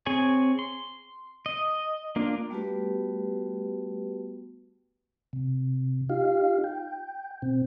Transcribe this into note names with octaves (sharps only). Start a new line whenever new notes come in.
C4 G#4 C#5 G#5
C6
D#5
A#3 D4 F4
G3 A3 B3 F#4 G4 B4
C3
D#4 F4 G4 F5
G5
B2 C4